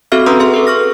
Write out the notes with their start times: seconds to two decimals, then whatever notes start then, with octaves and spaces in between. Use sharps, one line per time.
0.12 C4 F#4 A4 E5 F6
0.26 C#4 B4 A#5 C6 D#6 E6
0.40 G#4 E5 C6
0.54 A4 B4
0.67 C#6 F6 A#6